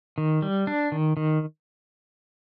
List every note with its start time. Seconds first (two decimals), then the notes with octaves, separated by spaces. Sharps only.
0.18 D#3
0.42 G3
0.67 D4
0.92 D#3
1.17 D#3